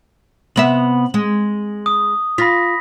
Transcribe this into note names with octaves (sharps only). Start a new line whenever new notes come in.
C3 B3 E5 F#7
G#3
D#6
F4 B5 A#6 B6